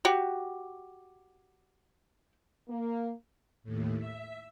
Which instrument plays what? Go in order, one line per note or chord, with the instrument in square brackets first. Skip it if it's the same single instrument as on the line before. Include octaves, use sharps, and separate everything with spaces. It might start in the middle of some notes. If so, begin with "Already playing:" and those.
[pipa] F#4 G4
[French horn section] A#3
[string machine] D#2 A2
E5